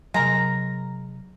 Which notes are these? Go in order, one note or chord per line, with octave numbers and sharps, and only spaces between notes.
C3 F#3 G#3 A#4 A#5